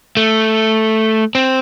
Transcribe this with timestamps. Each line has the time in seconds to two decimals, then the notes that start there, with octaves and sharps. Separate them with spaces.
0.17 A3
1.35 C4